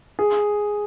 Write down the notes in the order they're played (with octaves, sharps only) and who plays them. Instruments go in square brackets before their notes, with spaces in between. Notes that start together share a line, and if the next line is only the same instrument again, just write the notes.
[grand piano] G#4